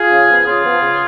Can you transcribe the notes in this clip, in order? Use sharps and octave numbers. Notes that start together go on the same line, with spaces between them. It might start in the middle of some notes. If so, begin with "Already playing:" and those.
Already playing: F4 G#4
C#3
F3 B3
C#3 F4 G#4
F3 B3
C#3